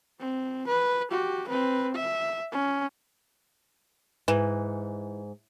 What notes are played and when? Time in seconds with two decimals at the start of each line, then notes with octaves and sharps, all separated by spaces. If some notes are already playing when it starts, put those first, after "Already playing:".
0.20 C4
0.68 B4
1.10 F#4 G4
1.49 C4 B4
1.95 E5
2.52 C#4
4.28 G#2 E3